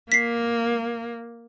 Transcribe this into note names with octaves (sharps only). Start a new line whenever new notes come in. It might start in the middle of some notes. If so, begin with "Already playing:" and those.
A#3 B6 C7